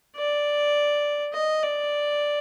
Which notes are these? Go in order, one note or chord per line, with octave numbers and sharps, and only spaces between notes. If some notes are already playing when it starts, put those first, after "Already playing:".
D5
D#5
D5